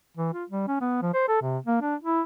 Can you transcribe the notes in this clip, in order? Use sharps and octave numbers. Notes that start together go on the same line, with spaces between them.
E3
F4
G3
C#4
B3
F3
C5
A4
C3
A#3
D4
E4